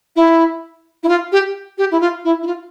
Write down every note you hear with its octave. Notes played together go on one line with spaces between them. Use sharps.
E4
E4
F4
G4
G4
E4
F4
E4
E4
F4